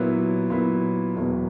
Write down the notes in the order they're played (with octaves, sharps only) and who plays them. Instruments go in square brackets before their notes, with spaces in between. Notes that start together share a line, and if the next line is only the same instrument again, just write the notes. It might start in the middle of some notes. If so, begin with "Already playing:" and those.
Already playing: [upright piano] A#2 F#3 B3 E4 B4
A#2 F#3 B3 E4 B4
E1 E2 B2 F#3 B3